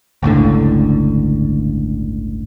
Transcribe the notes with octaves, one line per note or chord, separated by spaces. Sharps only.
G1 C#2 A2 D3